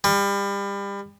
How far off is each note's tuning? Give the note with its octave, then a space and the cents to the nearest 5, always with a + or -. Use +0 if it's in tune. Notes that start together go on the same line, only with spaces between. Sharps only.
G3 +30